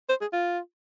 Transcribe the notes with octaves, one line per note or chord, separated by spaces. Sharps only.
C5
G#4
F4